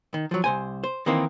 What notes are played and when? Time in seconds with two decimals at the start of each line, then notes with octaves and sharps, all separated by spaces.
0.14 D#3
0.31 F3 F#3
0.44 C2 C5 G#5
0.84 C5
1.06 D#3 E3 A#3 C4 D#4